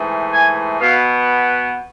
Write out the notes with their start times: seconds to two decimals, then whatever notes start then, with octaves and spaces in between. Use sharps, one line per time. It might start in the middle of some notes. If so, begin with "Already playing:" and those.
Already playing: G#2 E3 A3
0.33 G#5
0.81 B2 B3 F5